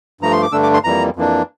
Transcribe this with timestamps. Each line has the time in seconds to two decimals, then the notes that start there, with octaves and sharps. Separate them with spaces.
0.21 G2 F3 A3 A#5
0.32 C6
0.42 D6
0.52 G2 D3 A3 D4 E6
0.63 D6
0.74 C6
0.84 F2 E3 G3 A#3 A#5
1.16 F2 E3 A#3 D4